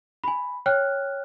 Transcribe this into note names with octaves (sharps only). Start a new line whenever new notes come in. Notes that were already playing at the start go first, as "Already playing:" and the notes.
G#5 B5
C#5 G5 F6 F#6